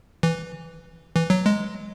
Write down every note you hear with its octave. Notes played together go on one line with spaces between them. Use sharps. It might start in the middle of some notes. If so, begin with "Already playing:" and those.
E3
E3
F#3
G#3